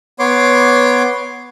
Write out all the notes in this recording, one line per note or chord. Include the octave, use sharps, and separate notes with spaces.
B3 C#5 C6 D6